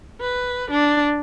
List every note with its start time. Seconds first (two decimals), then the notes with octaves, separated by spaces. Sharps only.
0.21 B4
0.71 D4